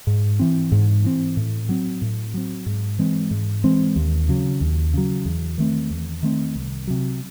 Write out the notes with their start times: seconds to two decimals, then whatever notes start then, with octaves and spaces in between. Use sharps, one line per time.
0.07 G#2
0.39 E3 C4
0.72 G#2
1.04 E3 C4
1.37 A2
1.69 F#3 C4
2.02 A2
2.34 F#3 C4
2.66 G#2
2.99 E3 G#3 C4
3.31 G#2
3.64 E3 G#3 C4
3.96 D#2
4.29 C#3 F#3
4.61 D#2
4.93 C#3 F#3
5.25 E2
5.58 D#3 A3 C4
5.90 E2
6.23 D#3 A3 C4
6.55 C2
6.87 C3 F#3